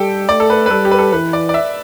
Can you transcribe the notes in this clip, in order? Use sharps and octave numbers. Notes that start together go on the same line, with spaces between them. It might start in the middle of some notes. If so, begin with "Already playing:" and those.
Already playing: G3 G4 A4 G5
A3 D5
A4
B4
B4
G3 A4
G4
B4
A4
E3 B4
D5
D5
E5